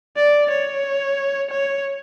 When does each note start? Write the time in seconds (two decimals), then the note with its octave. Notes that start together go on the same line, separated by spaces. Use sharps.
0.17 D5
0.50 C#5
1.51 C#5